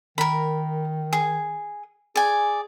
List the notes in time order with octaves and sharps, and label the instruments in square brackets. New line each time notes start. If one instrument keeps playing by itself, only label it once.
[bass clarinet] D#3 [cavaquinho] A#4 B5
[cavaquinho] G#4
[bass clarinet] G#4 [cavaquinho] D5 G#5